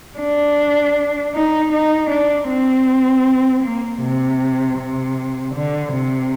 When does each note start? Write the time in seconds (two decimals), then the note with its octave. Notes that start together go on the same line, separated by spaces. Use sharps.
0.19 D4
1.35 D#4
1.72 D#4
2.10 D4
2.49 C4
3.64 A#3
4.02 C3
4.78 C3
5.55 D3
5.93 C3